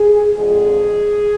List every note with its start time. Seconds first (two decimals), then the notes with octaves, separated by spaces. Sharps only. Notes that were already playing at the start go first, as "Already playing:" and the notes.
Already playing: G#4
0.35 F2 D3 F3 G#3 G#4